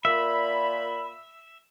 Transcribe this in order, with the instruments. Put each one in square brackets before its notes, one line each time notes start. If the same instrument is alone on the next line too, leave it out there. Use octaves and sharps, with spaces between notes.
[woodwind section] A#2 B5 [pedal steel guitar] E5